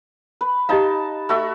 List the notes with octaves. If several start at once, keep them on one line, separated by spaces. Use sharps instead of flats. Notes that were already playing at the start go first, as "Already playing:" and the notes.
B4
D#4 G4 D#5 F5 A5
A3 F#4 E5